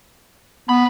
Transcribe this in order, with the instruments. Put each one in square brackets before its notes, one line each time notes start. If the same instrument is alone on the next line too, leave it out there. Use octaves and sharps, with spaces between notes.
[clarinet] B3 [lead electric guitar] C5 B5